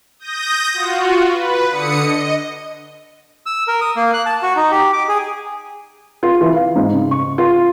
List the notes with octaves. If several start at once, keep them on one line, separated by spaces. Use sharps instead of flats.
D#6 G6 A#6
F4 F#4
B4
D3 D#6 C#7
D#5
E6
A#4
D#6
A#3
F#6
A5
F#4
D#4
G4
D6
G#4
F4
E3
F5
G#2
C#3
C#6
F4